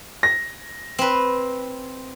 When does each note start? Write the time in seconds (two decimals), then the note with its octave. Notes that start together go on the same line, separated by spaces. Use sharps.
0.23 A#6
0.99 C4 B4